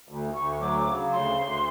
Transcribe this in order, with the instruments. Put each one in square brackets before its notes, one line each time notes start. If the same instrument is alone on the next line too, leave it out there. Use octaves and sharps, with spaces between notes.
[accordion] D2
[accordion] D2 [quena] C#6
[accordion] F#3 [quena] D6
[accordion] C#3
[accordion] D2 [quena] C6
[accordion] D2